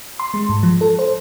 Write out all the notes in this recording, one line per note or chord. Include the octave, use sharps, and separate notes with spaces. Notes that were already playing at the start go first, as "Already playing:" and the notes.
C6
G#3
G#2
F3
A4
C5